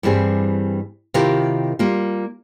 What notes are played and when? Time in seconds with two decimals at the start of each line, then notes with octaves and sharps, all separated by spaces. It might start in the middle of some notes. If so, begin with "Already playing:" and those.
0.03 G2 E3 G3 C4 G#4
1.14 C3 D#3 E4 F4 G4 A#4
1.79 G3 A#3 F4